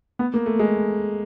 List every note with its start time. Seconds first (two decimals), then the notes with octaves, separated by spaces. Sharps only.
0.19 B3
0.34 A#3
0.46 A3
0.59 G#3